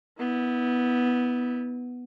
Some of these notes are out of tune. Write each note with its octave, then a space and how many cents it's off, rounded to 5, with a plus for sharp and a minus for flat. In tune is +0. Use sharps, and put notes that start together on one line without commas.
B3 +0 E4 -30